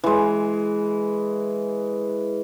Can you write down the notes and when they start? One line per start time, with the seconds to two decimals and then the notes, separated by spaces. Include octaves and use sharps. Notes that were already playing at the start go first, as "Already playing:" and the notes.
0.04 E3 G#3